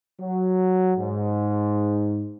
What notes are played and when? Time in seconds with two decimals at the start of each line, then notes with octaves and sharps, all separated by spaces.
0.20 F#3
0.97 G#2